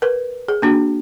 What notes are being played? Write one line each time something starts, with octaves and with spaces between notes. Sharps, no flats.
A#4 B4
G#4
A#3 D4 F#4